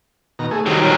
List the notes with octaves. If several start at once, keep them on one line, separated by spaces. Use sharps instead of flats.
B2 D#3 A#5
A3 G#4
C3 D#3 F#3 G3
A#2 F#3